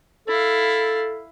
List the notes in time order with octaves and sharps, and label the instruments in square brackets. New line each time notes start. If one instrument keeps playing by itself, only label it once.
[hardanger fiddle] E4 F5 [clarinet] A4